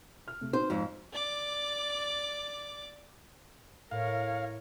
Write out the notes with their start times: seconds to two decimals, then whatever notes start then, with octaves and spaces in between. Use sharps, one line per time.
0.28 F6
0.41 C3 A3
0.53 C4 D#4 F#4 C5
0.70 F2 G#2
1.13 D5 D6
3.91 A2 A#4 C#5 F5